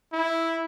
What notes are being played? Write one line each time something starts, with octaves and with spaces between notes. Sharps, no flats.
E4